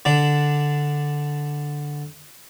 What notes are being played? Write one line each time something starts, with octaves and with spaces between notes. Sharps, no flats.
D3 D4